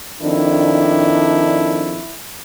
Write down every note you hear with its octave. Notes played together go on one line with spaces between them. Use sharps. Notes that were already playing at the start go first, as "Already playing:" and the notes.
F2 D#3 D4 E4